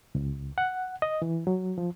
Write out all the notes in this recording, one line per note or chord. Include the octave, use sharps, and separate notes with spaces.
C#2
F#5
D#5
E3
F#3
F3